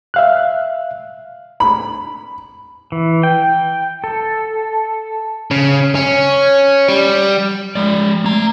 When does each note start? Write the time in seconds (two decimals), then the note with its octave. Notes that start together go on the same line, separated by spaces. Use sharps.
0.14 E5 F5 F#6
1.60 B5
2.92 E3
3.23 G5
4.04 A4
5.51 C#3
5.95 C#4
6.88 G3
7.76 G#3 D5
8.25 A3 A#5